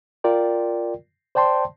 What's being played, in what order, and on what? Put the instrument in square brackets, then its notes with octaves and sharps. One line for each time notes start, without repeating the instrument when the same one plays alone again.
[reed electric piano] F4 A#4 D5 G5
C5 D5 G5 A5 C6